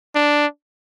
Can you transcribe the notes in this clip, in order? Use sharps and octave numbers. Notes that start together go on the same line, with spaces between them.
D4